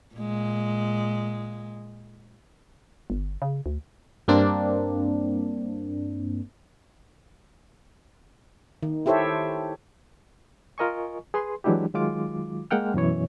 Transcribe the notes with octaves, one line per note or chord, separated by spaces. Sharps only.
A#2 G#3
G1
C#3
D2
G2 A#3 C4 D4
D#3
E4 G4 A4 C5 C#5 E5
F4 A#4 D#5 G#5 C#6
G#4 B4 C6
E3 F#3 G#3 D4 E4 G4
D#3 F#3 G#3 F4 D6
G#3 A#3 F#5 G5 F6
F#2 B2 E3 C#5